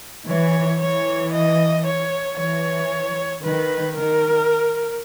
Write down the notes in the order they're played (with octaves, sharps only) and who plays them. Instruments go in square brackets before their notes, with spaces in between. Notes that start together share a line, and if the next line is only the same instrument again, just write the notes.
[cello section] E3 [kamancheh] C#5
[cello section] E3 [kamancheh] C#5
[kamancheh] D#5
C#5
[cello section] E3 [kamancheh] C#5
[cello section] D#3 [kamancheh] B4
[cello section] D#3 [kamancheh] A#4